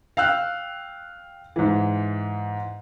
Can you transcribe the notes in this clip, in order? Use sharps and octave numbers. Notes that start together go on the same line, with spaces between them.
F5 G5 E6 F#6
G#2 E3